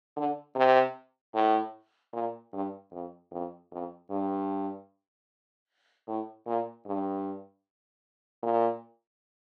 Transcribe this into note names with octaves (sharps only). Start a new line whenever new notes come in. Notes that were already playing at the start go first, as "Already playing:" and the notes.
D3
C3
A2
A#2
G2
F2
F2
F2
G2
A2
A#2
G2
A#2